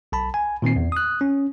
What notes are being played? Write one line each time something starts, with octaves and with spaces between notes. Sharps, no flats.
B1 A5 B5
G#5
A#2 D#3 C4 C7
E2
D#6 F#6
C#4